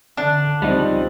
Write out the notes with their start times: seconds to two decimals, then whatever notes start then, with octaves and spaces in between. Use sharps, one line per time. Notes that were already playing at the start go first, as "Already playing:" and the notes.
0.17 D3 D4
0.62 C#2 F3 G3 C4 D#4